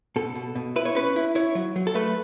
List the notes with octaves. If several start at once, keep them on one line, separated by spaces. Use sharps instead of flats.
B2 A4
B2
B2
E4 B4
C#5
C#4 B4
E4
E4 C#5
F#3
F#3
A4
A3 B4